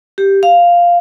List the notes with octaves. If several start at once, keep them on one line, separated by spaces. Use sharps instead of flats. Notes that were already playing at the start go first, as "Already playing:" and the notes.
G4
F5